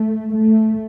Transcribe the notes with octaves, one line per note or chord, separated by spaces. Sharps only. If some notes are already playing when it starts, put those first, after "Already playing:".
Already playing: A3
A3